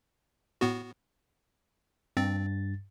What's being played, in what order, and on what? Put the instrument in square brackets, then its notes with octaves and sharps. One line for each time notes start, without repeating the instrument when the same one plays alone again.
[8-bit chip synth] A2 B3 F#4
[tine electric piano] G2 A6 [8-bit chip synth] C4